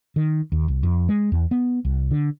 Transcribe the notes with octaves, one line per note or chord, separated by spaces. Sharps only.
D#3
D#2
C2
F2
G#3
E2
B3
C2
D3